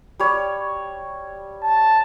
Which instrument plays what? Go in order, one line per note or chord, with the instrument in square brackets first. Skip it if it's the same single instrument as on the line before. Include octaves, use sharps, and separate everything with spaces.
[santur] G3 C#5
[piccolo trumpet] A5